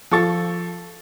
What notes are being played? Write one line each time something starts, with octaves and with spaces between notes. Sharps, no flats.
F3 A4 C#6 A6